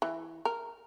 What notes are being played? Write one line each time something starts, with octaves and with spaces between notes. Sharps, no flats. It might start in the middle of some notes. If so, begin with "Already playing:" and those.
E3
A#4